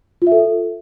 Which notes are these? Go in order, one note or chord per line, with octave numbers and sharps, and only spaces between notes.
F4
E5
A4